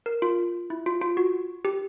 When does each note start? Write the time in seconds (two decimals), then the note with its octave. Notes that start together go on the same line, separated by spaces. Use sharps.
0.06 A#4
0.22 F4
0.70 E4
0.86 F4
1.01 F4
1.17 F#4
1.65 G4